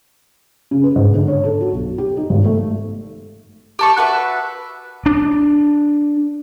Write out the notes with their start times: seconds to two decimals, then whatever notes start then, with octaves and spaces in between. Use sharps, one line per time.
0.71 C#3
0.84 B4
0.96 G#2
1.14 D3
1.28 C#5
1.44 A4
1.60 F#4
1.73 B1
1.98 G4
2.17 D#4
2.29 G#1
2.45 A3
3.79 G4 A5 C#6
3.97 F#4 B4 E5
5.06 D4